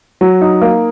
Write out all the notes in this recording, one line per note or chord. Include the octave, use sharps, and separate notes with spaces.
F#3
D#4
A#3